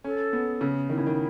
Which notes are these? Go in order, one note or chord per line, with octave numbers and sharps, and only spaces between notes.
C#4 A4
B3
C#3
D#3 E4
C#3
D#3